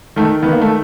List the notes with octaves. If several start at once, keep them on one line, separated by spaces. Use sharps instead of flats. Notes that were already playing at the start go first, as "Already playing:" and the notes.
D#3 A3
D#3 B3
A#3
A3